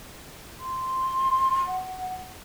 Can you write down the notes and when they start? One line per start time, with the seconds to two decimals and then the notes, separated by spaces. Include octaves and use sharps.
0.60 C6
1.67 F#5